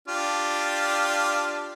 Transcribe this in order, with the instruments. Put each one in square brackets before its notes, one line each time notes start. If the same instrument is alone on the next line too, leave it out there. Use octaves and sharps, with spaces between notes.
[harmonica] D4 F4 G4